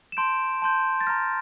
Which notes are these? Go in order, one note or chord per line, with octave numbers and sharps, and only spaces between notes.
E7
A5 C6 G6 D7
A5 C6 G6
A6
A#5 F6 A#6